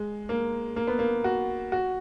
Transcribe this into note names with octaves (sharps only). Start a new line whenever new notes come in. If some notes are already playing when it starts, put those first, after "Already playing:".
Already playing: G#3
A#3
A#3
B3
A#3
F#4
F#4